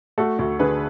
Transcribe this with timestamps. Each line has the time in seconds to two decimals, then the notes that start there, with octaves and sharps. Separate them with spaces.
0.18 A3 F#4 A4
0.39 D2 F#4
0.59 D3 G#4 B4